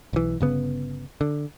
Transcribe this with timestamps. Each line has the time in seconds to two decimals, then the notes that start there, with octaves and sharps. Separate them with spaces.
0.13 B1 E3
0.40 G1 C#3 B3
1.21 D3